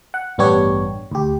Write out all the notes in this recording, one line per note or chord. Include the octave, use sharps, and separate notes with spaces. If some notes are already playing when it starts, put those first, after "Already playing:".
F#5
A1 G2 B3 D4 G4 C#5
D2 G4